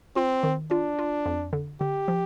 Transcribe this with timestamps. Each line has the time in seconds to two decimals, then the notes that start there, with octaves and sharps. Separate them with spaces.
0.16 C4 F4
0.43 D#3
0.71 D4 F4
0.99 F4
1.26 F2
1.53 D3
1.81 D3 G4
2.08 F3